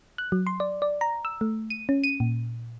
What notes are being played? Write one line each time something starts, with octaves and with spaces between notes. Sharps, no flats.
F#6
F#3
C6
D5
D5
A#5
E6
A3
D#7
C#4
D#7
A#2